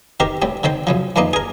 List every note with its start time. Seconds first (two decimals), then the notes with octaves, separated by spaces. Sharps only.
0.20 D#3 C4 G4 A#4
0.42 A2 G3 C4
0.63 D3 D#3 C4 C5
0.87 F#2 C#3 F3
1.16 F2 E3 A#3 D4 D#4
1.33 G#4 A#4